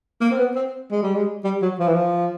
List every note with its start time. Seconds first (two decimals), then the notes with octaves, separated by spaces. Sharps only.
0.21 A#3
0.31 C4
0.38 B3
0.55 C4
0.91 G#3
1.03 G3
1.15 G#3
1.44 G3
1.62 F#3
1.79 F3
1.87 E3
1.94 F3